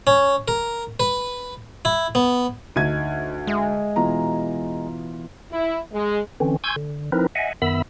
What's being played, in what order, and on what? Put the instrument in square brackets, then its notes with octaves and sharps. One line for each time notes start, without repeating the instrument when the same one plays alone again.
[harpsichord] C#4
A#4
B4
E4
B3
[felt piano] D2 G#6 [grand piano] D#4 D#7
[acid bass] G#3 [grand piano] E5
[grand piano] B2 E3 F4 [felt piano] A#5
[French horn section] E4
G#3
[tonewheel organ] D3 E3 C4 C#4
G#5 C6 C#6 E6 G6 G#6
D3
F3 C4 D#4 E4 A#4 B4
D#5 E5 F#5 G#5
F#2 D#3 B3 E5 B5 E6